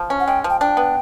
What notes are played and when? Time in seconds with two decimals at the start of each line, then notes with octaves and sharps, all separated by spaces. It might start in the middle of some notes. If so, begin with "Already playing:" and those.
Already playing: F3
0.10 C#4
0.20 F#5
0.27 G#3 G5
0.44 F3
0.50 G5
0.61 D4 G5
0.77 B3